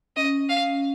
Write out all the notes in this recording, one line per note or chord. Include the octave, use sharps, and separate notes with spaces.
C#4 D#5
F5